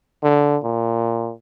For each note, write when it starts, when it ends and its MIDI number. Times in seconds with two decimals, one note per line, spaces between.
0.23 0.58 50
0.64 1.32 46